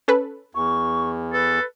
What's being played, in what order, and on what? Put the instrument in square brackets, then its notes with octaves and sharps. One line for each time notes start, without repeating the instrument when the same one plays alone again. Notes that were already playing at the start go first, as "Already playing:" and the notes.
[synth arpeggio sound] C#4 A4 B4
[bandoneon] E2 [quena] C#6
[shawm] A4 [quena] B4